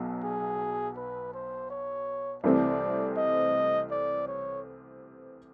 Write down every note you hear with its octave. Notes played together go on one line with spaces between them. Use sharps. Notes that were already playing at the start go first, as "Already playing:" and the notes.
Already playing: B1 B2 F#3
G#4
B4
C5
C#5
C2 C3 E3 A3 C4 D5
D#5
D5
C#5